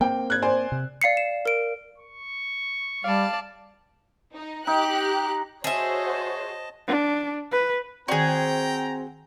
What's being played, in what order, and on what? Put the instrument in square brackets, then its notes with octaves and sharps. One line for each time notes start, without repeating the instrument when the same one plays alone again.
[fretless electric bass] A#3 C4 [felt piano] G5
[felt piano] F#6 G#6
C5 D5 G#5
[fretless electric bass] C3
[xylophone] D5 F5 C7 C#7
E7
A#4 D7
[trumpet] C#6
[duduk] G3 [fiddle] D5 A5 [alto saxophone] F5
[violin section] D#4
[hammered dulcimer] D#4 [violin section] G4 F#6
[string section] F#4 C5 C#5 [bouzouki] G#4 E5 [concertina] D#5 A5
[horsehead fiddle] D4
B4
[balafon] D#3 D5 [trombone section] C4 [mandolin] F#4 G#4 [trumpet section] G5 A#5